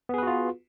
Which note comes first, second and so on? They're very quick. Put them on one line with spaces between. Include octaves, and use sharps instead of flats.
B3 G#4 B4 F#4 F4